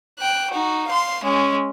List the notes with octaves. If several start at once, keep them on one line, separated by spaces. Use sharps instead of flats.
G5 F#6
D#4 F#4
F5 C6
G#3 C#4